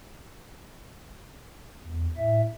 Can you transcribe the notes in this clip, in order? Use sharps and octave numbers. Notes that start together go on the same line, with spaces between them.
E2
A2 E5